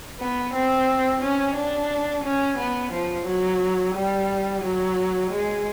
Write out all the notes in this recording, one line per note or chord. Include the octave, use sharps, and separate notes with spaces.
B3
C4
C#4
D4
C#4
B3
F3
F#3
G3
F#3
G#3